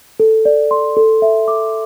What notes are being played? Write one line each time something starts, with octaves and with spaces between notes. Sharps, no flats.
A4
D5
C6
A4
E5
D6